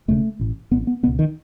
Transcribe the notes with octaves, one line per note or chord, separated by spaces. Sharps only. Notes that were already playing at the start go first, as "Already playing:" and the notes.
E1 D#2 C#3 A3
A1 A2
A1 A2 B3
B3
C#2 B2 B3
D#3